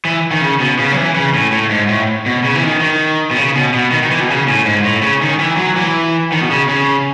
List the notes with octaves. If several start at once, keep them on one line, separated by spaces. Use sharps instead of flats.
E3
D#3
C#3
B2
C#3
F#3
E3
C#3
A2
A2
G#2
A2
B2
C#3
E3
D#3
D#3
B2
C#3
B2
B2
D#3
D#3
E3
B2
C#3
A2
G#2
A2
C#3
D#3
E3
F#3
E3
D#3
B2
C#3
C#3